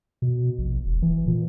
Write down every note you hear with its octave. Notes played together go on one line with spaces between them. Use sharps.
B2
A#1
E1
E3
A#2